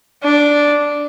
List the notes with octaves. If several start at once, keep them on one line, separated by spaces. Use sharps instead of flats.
D4